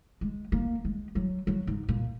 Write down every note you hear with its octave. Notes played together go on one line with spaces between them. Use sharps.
G#3
A#3
G#3
F#3
F#3
G#2
A#2